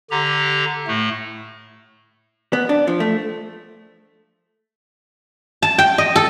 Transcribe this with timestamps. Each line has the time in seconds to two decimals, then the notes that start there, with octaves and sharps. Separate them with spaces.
0.11 D3 G4 A#5
0.87 A2 A3
2.53 B3
2.69 D4
2.87 F3
3.00 A3
5.62 A5
5.78 G5
5.98 D#5
6.16 A4